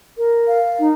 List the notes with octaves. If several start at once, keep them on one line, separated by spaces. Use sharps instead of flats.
A#4
F5
D#4